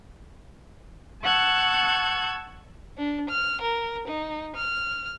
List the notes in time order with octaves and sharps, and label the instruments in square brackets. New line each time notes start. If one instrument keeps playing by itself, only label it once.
[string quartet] F#5 A5 C#6 E6 F#6 G#6
[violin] D4
F6
A#4
D#4
F6